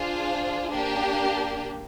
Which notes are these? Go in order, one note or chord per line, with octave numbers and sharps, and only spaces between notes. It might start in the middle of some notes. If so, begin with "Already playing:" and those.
Already playing: D4 F4 G#4 C5 F5
A#3 D4 G4